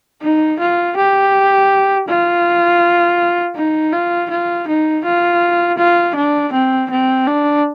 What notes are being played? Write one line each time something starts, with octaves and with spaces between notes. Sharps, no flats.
D#4
F4
G4
F4
D#4
F4
F4
D#4
F4
F4
D4
C4
C4
D4